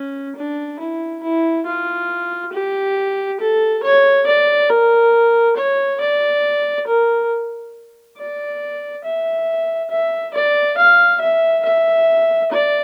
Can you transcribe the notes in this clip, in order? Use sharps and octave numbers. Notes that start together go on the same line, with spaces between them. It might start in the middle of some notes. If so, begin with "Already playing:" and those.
Already playing: C#4
D4
E4
E4
F4
G4
A4
C#5
D5
A#4
C#5
D5
A#4
D5
E5
E5
D5
F5
E5
E5
D5